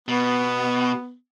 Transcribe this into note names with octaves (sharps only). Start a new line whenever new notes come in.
B2 B3